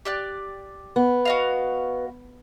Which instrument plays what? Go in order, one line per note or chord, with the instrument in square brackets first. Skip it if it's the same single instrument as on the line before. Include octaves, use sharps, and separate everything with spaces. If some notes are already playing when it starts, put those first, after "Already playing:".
[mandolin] G4 D5 F#6
[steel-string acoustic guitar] B3
[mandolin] F#4 D#5 F5